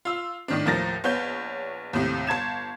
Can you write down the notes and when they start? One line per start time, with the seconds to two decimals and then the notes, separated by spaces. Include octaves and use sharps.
0.05 F4 E6
0.48 A2 D#3 D4
0.66 D#2 A2 F3 A#4 A6 A#6
1.04 A#1 B3 C#5 G6
1.93 D#2 A2 C3
2.27 G1 A5 G#6 E7